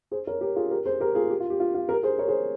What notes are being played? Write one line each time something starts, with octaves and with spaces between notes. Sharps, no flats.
G#4 C5
A#4 C#5
G4 A#4
F4 G#4
G4 A#4
G#4 C5
G4 A#4
F4 G#4
G4
F4
G4
F4
F4
G4 A#4
G#4 C5
A#4 C#5
G#4 C5